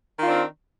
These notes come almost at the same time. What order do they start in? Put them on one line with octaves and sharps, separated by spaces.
D#3 F4 D4 C4